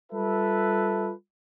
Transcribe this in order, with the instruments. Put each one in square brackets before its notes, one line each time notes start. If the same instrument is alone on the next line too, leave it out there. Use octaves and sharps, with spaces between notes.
[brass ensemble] G3 F4 A4 B4 E5